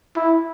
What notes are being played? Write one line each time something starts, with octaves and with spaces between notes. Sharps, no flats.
E4